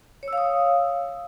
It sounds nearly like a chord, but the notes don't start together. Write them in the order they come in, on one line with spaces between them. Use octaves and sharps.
C#5 E6 F5 D#6